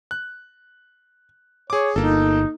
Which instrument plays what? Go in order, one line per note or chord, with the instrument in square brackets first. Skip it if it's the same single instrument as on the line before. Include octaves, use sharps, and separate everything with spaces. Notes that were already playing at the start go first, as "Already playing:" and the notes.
[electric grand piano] F#6
[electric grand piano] G#4 D6 [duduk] C#5
[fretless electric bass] G1 [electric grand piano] A#3 A4 [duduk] D#4